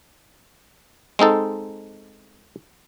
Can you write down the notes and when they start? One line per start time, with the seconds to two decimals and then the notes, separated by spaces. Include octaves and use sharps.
1.19 G#3 C4 D#4 A4